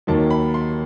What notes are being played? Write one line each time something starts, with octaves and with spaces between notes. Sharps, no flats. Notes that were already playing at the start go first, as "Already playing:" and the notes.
D#2 D#3 F#3 A#3 A5
B5
C6